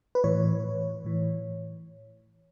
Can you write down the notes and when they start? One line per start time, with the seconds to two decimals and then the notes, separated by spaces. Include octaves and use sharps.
0.15 B4
0.24 A2 E3 C#5
1.04 A2 E3